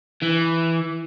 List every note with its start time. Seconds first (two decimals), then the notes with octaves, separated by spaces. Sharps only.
0.22 E3